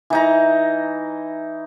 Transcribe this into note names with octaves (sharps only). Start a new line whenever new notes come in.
E3 D#4 A#5